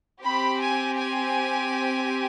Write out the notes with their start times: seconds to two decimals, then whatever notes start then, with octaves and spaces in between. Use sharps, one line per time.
0.21 C4 G4 B5
0.58 G#5
0.94 G#5